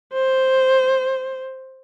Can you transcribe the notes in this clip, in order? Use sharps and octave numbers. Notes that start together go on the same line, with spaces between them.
C5